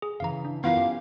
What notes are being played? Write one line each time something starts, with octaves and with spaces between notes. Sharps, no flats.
G#4
C#3 E3 F5 A#5
D4
E3 B3 E4 F4 A#4 F5
C#4 G4